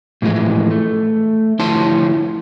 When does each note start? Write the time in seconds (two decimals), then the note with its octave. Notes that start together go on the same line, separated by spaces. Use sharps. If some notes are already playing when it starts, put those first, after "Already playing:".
0.22 A2 E3 F3 G#3
0.70 A3
1.60 D2 F3 E4 C#5 A5 C6